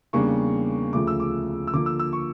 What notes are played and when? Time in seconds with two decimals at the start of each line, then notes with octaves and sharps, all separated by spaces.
0.13 E2 C#3 G3 A#3 D4 C#6
0.93 D2 C#3 F3 A3 D6
1.07 E6
1.20 D6
1.67 E6
1.73 D3 F3 A#3 D6
1.86 E6
1.99 E6
2.13 C#6